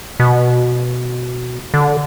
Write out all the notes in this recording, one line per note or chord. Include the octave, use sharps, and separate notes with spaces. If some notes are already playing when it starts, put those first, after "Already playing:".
B2
D3